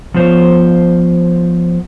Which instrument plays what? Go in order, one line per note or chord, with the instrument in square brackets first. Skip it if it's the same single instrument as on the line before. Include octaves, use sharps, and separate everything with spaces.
[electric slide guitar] F3 B3 F4 C5 C#5